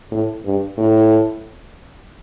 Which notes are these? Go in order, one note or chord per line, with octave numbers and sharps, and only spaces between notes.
A2
G2
A2